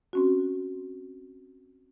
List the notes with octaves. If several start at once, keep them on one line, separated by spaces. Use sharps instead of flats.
C4 C#4 F#4